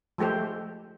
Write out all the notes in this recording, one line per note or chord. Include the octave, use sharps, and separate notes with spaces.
F3 G#3 A3 G4 C5